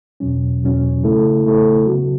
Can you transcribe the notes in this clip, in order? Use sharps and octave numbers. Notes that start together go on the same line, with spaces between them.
E2 B2 F#3 C#4
E2 B2 F#3 C#4
C#3 A3 E4 A4
C#3 A3 E4 A4
C#3 F#3 B3 F#4